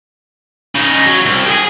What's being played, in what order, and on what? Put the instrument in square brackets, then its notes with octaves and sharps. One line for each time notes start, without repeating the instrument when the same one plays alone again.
[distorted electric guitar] C#3 D#4
F#3
C2
G4 G#4